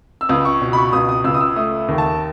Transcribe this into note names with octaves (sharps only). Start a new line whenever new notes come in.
E6
C#2 D#6
C#6
B2
B5
C#6
C#2 D#6
D#6
C#2 E6
D#6
E6
A3 D#6
D#2
A5